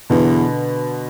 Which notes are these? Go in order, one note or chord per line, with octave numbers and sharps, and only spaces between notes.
E2 B2 D3